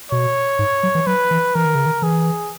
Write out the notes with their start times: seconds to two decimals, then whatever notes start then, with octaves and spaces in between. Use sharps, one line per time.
0.11 B2 C#5
0.59 G#2
0.83 F#3
0.95 E3
1.07 F#3 B4
1.31 E3
1.55 E3 A#4
1.65 D#3
1.75 C#3
1.86 D#3
2.02 E3 G#4